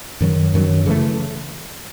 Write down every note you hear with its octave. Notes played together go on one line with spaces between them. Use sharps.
F#2 D#3 F#3
F#2 D#3 F#3
C#3 E3 A3